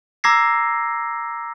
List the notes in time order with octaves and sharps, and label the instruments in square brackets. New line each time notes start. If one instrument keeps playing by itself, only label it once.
[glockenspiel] A#5 D6 E6 G#6 A#6 C7